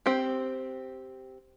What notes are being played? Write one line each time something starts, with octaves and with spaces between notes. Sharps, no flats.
C4 G4